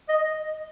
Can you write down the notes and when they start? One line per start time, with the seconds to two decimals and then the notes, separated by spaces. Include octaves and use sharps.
0.09 D#5